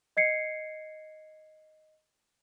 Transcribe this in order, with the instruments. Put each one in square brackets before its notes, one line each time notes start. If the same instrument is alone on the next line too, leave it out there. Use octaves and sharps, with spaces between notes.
[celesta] D#5 G#6 C7 C#7